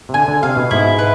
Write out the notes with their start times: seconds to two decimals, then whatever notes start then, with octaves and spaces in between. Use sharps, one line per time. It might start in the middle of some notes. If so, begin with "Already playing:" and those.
0.09 C3
0.14 D3 G#5
0.28 D3
0.43 C3 F5
0.56 B2
0.71 G#2 E4
0.99 B4